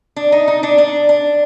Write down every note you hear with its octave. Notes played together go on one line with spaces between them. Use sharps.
D4
D#4
D#4
D4
D4
D4